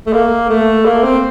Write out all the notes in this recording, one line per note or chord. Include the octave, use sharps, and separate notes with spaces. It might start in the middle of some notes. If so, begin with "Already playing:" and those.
A3
A#3
A3
A#3
C4